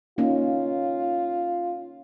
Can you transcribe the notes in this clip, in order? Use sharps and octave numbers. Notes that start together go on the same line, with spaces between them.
A#3 C#4 D#4 F4